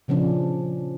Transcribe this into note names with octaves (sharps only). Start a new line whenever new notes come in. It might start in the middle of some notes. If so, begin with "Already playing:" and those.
A#2 C#3 F3 C#4 D4